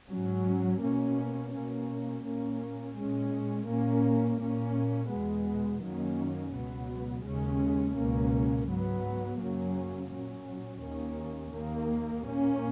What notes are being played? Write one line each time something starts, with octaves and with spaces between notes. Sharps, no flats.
G#2 F#3 C#4
B2 A#3 C#4
B2 A#3 C#4
A#2 A#3 C#4
A#2 G#3 C#4
A#2 A#3 C#4
A#2 A#3 C#4
E2 B2 G#3 B3
F#2 D#3 F#3 A#3 C#4
C#2 B2 F#3 B3
D#2 C#3 G#3 C#4
C#2 B2 A#3 C#4
G#2 F#3 B3
F#2 C#3 F#3 A#3 C#4
A#2 F#3 C#4
D#2 D#3 A#3 C#4
D#2 D#3 A#3
A#2 A#3 C#4